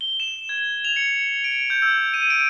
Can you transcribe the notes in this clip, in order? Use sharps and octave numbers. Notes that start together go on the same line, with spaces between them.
G7
E7
G#6
F7
C#7
D7
G6
E6
D#7
D7